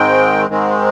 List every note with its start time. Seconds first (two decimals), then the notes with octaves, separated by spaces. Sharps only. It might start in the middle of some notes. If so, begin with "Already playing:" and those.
Already playing: G#2 D#3 G#3 C4 G5
0.49 G#2 D#3 G#3 C4